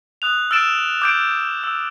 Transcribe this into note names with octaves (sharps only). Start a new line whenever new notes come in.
D#6 F#6 F7
E6 F6 A6 D7 E7
D6 G6 D7
E6